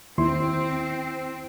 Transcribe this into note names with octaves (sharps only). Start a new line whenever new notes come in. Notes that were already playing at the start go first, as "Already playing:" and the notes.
D#2 C4 E4 C6